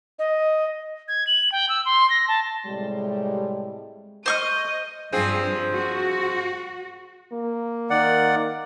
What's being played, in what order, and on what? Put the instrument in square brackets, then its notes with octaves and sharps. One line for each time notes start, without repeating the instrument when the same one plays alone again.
[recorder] D#5
[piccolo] G#6
F#7
G5
E6
C6
A#6
A5
[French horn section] A2 C3 G3 G#3
[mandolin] C5 C#6 F6 [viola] D#5
[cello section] G2 [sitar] F3 C4 G#4
[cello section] F#4
[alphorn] A#3
[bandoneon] D#3 D5 F#5